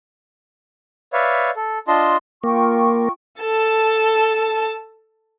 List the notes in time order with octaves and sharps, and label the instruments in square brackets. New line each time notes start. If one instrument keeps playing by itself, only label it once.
[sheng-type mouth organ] B4 C#5 D5 E5 F5
A4
D4 F4 D#5 A5 C6
[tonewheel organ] A#3 [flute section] F4 G5 C#6
[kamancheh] A4 A5